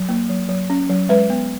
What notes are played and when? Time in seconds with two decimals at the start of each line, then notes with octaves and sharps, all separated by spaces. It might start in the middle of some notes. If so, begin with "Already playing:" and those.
Already playing: F#3
0.09 A#3
0.29 F#3
0.49 F#3
0.70 C#4
0.89 F#3
1.09 G#3 B4
1.30 B3